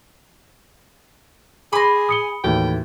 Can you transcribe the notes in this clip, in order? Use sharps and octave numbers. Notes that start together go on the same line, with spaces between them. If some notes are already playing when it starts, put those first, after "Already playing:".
G#4 B5 C6 D6 A#6
D#6 C#7 G7
D#2 A2 E3 F#4 G5